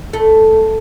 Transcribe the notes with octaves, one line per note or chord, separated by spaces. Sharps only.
A3